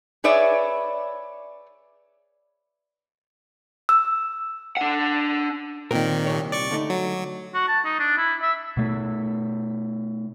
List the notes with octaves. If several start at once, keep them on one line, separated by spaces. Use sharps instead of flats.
G#4 B4 C#5 D5 E5
E6
D4 F#5
A#2 D#3 C4 A#4
C2 C#5
D5 C#6 C#7
D3 A3 D#4
F#3
F#4
A5
D#4
D4
E4
E5
B2 A3